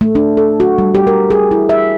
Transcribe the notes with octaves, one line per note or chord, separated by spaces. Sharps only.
A3
D4
A4
F#4
G3
G4
A#4
G#4
E4
E5